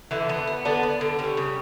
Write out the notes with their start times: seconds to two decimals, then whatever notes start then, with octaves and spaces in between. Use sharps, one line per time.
0.11 D3 E3 E4
0.29 B3
0.47 B3
0.65 D3 B3 D4
0.83 B3
1.01 D3
1.19 G3 C#4
1.37 C#3